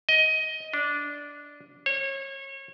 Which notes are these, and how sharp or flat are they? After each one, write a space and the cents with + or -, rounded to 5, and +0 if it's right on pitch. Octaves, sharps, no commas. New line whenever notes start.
D#5 +15
D4 -10
C#5 -30